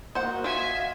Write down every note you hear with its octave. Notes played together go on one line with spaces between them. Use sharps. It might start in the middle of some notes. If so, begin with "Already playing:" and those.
A#3 F#4 C5 D#5 F#5
F4 E5 F5 G#5